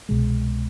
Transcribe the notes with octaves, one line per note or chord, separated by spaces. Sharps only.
C2 B2 G#3